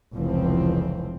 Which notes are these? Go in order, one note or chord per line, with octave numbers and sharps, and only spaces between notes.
F1 C#2 E3 F3 C4